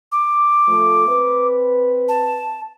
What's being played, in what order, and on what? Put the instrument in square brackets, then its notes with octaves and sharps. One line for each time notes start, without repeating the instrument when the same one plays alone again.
[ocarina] D6
[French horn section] F3 A3
C4 B4
[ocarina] A5